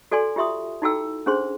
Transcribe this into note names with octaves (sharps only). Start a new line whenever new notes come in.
F#4 A4 D5 G#5 C6
F4 G4 E5 C6 D#6
D#4 E4 F#4 A4 G5 E6
C#4 D4 G#4 C5 C6